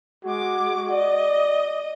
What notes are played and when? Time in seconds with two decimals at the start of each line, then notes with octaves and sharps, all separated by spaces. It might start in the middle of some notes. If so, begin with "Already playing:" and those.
0.25 G#3 F#4 D6
0.90 D5 D#5